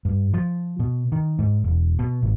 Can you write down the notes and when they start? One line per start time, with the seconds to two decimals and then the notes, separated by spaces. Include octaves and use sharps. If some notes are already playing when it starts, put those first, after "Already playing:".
0.05 G2
0.34 F3
0.80 B2
1.12 D#3
1.39 G#2
1.64 E1
1.99 B2
2.23 G#1